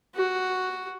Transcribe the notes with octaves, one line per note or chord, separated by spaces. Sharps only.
F#4